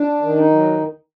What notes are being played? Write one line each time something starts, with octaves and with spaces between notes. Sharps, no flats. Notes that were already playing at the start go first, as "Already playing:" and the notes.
Already playing: D4
D#3
D#4
F#3